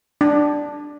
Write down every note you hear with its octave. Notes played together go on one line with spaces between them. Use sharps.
D4